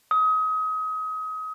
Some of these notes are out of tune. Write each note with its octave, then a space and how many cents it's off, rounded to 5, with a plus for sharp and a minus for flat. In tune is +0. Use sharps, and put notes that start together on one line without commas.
D#6 +30